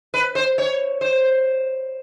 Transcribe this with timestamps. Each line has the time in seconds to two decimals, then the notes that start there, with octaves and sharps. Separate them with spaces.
0.14 B4
0.35 C5
0.58 C#5
1.01 C5